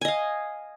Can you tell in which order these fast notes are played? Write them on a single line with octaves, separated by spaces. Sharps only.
G#5 D#5 F5